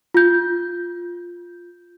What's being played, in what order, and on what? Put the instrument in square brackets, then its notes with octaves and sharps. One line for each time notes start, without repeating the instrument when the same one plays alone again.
[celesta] F4 G6